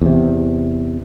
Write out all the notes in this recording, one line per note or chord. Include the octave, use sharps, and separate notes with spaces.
E2 C3